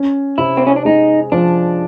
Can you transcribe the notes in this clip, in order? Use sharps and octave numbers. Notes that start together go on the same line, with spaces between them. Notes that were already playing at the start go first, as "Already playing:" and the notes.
Already playing: C#4
C3 E4
C4
C#4
D4
G#3 D#4
F3 D4